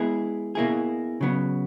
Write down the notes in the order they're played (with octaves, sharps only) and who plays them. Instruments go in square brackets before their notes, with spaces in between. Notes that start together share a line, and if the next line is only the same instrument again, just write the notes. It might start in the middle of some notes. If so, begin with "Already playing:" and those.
Already playing: [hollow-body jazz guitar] G#3 B3 E4 G#4
B2 A#3 E4 G#4
C#3 F#3 B3